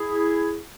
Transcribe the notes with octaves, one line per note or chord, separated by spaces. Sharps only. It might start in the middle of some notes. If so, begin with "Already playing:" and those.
Already playing: E4 G#4